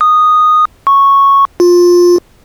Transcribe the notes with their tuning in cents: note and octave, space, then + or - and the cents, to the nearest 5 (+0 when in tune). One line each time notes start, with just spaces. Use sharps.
D#6 -10
C#6 -5
F4 +15